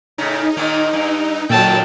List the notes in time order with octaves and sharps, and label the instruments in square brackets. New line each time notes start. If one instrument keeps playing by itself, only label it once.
[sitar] A2 C#3 [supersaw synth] D#4
[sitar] A#2 D#3 A#3
G2
[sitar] F#2 D#3 A4 [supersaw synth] A#2 F#3 [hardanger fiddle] G5 A5